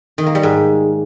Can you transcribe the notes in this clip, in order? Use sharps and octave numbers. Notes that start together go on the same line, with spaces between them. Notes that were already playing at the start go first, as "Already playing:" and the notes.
D#3
A#3
G3
G#2